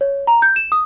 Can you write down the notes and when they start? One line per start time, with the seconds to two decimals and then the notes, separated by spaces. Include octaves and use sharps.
0.01 C#5
0.27 A#5
0.42 G6
0.56 E7
0.72 D#6